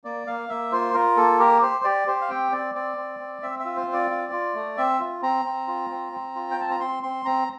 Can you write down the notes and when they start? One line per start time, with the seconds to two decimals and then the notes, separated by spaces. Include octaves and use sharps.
0.04 A#3 D5
0.27 A#3 F5
0.49 A#3 E5
0.72 F4 C5
0.94 F4 A#4
1.17 A#3 A4
1.40 G4 A#4
1.62 G4 C5
1.84 G4 D5
2.07 G4 C5
2.21 F5
2.30 C4 G5
2.52 C4 D5
2.75 C4 D5
2.97 C4
3.20 C4
3.42 C4 E5
3.59 E5
3.65 F4
3.76 C5
3.87 C4
3.93 D5
4.11 F4
4.32 F4
4.54 A3
4.77 C4 E5
4.99 F4
5.22 C4 A#5
5.45 C4
5.68 F4
5.90 C4
6.12 C4
6.35 F4
6.51 G5
6.58 C4 A5
6.70 A#5
6.80 C4 C6
7.03 C4 C6
7.25 C4 A#5